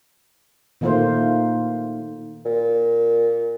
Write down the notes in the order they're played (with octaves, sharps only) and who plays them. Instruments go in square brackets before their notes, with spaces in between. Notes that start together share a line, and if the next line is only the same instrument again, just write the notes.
[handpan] A#2 D#3 A3 A#3 F4 C5
[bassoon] A#2